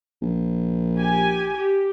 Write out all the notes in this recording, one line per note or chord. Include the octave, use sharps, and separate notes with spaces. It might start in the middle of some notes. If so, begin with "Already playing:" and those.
A#1
G4 G#5
G4